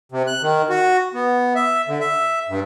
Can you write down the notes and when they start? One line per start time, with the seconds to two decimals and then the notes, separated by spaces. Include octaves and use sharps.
0.12 C3
0.27 F#6
0.42 D#3
0.70 F#4
1.14 B3
1.55 E5
1.88 D3
2.00 E5
2.49 G2